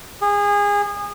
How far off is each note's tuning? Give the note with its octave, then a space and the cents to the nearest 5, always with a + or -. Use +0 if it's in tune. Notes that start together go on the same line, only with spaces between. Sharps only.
G#4 -25